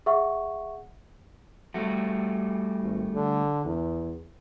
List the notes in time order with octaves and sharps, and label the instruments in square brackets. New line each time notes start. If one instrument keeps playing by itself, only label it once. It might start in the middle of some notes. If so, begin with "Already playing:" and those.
[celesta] G#4 E5 F#5 C#6
[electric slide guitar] G3 A3 F#4
[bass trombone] G#1
D3
E2